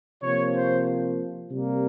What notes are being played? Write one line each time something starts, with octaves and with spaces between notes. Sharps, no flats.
C3 F3 A#3 C#5
C5
C3 G3 A#3